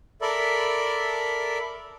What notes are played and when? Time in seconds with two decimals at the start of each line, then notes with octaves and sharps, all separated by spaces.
0.21 A4 A#4 D5 E5 B5